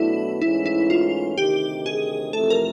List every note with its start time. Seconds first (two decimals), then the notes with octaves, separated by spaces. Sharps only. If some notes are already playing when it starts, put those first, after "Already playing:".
Already playing: B2 F#3 A3 D4 E4
0.41 G#2 E3 A3 C#4 E4
0.66 E4
0.90 F4
1.37 D2 C3 D#3 G4
1.86 G#4
2.33 F2 C3 E3 A3 A4
2.50 A#4